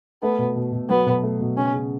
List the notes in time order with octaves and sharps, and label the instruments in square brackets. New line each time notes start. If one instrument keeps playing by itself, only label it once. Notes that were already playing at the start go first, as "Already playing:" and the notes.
[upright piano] A3 [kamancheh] B3
[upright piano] B2
B2
B2
[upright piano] F#3 [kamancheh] B3
[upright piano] B2
A3
B2
[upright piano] C#3 [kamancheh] C#4
[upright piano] C#3